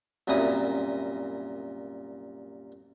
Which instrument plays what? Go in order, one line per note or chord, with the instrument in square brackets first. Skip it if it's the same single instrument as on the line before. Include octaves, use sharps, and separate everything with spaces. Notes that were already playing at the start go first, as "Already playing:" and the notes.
[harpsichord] C2 F#2 A#2 E4 D#6